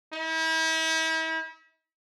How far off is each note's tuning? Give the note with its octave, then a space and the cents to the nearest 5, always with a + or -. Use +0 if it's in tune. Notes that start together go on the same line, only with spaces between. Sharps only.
E4 -40